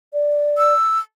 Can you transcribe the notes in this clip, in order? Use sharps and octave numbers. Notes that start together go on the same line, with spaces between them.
D5
E6